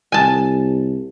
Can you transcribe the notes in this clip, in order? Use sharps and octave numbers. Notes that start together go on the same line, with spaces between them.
C2 G#5 A5